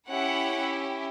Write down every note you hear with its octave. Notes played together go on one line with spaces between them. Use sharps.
C#4 E4 G4 F#5